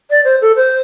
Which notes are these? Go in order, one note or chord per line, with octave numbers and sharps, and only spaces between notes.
D5
C5
A4
C5